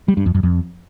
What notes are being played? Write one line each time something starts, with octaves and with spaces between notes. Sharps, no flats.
G3
G2
F2
F#2
F2